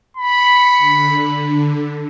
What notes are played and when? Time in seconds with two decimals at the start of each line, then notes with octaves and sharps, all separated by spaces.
0.17 B5 B6 C#7
0.78 D3